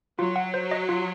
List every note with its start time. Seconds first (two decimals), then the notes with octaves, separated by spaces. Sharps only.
0.19 F#3 F4
0.36 F#5
0.54 C5
0.71 D#5
0.89 F4